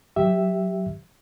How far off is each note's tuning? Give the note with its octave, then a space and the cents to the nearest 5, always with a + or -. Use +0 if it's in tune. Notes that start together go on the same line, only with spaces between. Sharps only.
F#3 +0 G4 +0 E5 +0